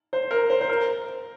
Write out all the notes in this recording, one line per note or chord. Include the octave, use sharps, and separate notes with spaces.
C5
A#4
C5
C5
A#4